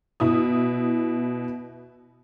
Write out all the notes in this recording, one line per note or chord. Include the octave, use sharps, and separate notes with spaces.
B2 E4 D#6